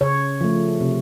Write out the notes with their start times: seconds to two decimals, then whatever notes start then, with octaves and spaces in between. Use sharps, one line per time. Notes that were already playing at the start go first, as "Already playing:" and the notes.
0.01 C#3 C#5
0.41 F3 A3
0.81 C3